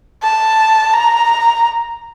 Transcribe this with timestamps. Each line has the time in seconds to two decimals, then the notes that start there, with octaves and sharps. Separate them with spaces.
0.23 A5
0.94 A#5